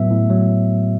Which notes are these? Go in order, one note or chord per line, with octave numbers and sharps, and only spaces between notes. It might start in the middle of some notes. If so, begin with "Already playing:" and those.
Already playing: A2 F#3 B3 E5
A2
F#3